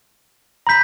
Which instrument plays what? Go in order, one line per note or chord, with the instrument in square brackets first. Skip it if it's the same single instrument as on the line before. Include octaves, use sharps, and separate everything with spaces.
[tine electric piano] A#5 G6 [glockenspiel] B5 B6